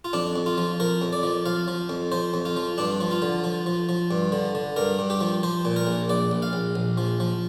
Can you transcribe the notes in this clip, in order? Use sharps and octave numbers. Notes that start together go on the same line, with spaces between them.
F4
F2 D4
F2
F4
F3
F3 A#4
F2
D5
F3
F3 F5
F3
F2
F3 C5
F2
F4
F3
G2 D4
F3
F4
D3
F3
F3
F3
G2
D3
D3
G2 A#4
G2
G4
F3
F3 C5
A#2
A#4
A#1
A#1 D5
A#1
F5
A#1
A#1
F3
F3